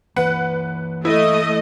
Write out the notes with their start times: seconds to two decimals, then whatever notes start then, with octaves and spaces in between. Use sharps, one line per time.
0.16 E3 A#3 B4 F#5
1.05 A3 E4 D#5